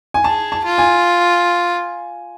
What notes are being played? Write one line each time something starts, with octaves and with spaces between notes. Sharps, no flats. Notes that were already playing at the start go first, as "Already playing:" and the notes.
G#5
G#4 A5
A5
F4
G#5